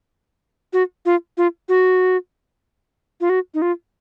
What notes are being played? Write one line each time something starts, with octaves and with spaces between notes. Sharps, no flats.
F#4
F4
F4
F#4
F4
F#4
D#4
F4